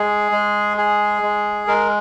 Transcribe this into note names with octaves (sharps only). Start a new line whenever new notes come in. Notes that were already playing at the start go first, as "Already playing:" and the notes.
Already playing: G#3 G#4
G#3
G#4
G#3
G#3 A#4